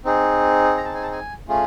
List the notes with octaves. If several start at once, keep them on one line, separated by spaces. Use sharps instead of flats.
C4 D#4 G#4
A#5
A5
G#5
A5
G#5
A3 C#4 F4 G#4